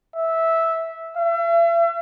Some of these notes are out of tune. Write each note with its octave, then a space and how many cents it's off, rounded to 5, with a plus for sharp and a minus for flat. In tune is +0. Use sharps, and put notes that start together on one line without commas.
E5 -10
E5 +40